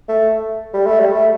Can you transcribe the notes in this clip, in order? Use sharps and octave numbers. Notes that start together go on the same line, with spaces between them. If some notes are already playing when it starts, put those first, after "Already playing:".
A3
G3
A3
G3
A3